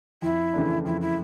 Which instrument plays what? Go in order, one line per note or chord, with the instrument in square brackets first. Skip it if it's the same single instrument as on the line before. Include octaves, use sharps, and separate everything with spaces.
[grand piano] F2 [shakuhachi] E4
[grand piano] C#3 E3 A3 D4
[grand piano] F2 [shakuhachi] E4
[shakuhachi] E4